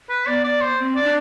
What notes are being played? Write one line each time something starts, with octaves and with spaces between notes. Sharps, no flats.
B4
B3 D5
D5
C5
C4
D5
D4